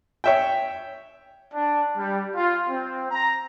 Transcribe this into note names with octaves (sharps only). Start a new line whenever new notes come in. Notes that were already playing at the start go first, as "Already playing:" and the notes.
C#5 E5 G5
D4
G3
F4
C4
A#5